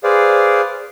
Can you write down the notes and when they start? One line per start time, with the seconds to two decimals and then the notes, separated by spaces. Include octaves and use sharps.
0.04 G#4 B4 C5 D5 F5